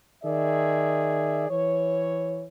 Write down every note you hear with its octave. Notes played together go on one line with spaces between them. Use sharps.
D#3 G#4 D5 E5
E3 C#5